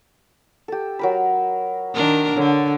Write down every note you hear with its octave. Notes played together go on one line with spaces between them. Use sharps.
G4 A4
F#3 A#4 B5
D#3 D4 A#4
D3 A4 C#5 F5